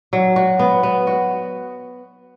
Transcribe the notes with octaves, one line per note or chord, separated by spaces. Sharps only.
F#3
F#4
B3
B3
F#4